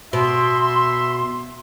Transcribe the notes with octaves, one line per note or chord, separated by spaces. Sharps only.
B2 E5 C6